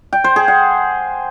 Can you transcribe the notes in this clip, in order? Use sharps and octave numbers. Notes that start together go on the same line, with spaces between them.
G5
C5
G#4
F#5